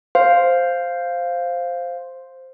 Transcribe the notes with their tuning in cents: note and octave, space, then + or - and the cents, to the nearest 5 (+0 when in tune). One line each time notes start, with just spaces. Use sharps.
C5 +0 F5 +0